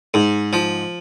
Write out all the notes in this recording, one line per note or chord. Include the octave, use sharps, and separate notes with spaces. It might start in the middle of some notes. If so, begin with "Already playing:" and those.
G#2
F3